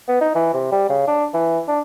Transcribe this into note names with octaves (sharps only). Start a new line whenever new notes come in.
B3
D#4
E3
C3
G3
C#3
D4
E3
D4